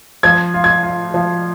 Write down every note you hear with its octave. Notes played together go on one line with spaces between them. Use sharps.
F3 G#6
F4
G#6
F4
F3